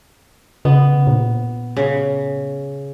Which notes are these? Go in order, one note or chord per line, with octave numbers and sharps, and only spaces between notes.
C#3 B3
A#2
C#3